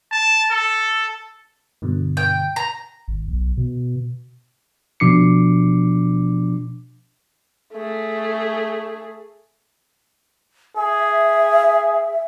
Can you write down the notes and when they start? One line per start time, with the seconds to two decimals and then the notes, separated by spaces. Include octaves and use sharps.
0.11 A5
0.51 A4
1.82 G2 B2 D3
2.17 G5
2.56 A#5
3.08 G#1
3.28 B1
3.57 B2
5.00 B2 F3 D4 D6 C7 C#7
7.74 A3 G#4
10.77 G#4 E5